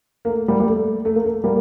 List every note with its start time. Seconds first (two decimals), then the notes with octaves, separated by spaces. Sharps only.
0.25 A#3
0.30 A3
0.48 G3 A#3
0.60 G3
0.68 A3
1.05 A3
1.16 A#3
1.24 A3
1.44 G3 A#3